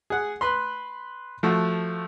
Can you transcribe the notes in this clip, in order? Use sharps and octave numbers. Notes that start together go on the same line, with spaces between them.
G#4 F#5
B4 B5 C6
F3 A3 F#4